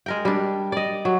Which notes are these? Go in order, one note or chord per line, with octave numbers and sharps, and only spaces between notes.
G#3 A#4 G5
G3 D4
D5 D#5
F#3